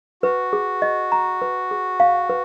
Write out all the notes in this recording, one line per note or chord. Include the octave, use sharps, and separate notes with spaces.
F#4 B4
G#4
D#5
A#5
B4
G#4
F5
B4